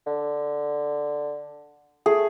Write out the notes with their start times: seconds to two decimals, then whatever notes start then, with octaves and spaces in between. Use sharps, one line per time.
0.07 D3
2.06 A3 G#4